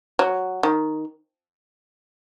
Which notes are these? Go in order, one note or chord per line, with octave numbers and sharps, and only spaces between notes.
F#3
D#3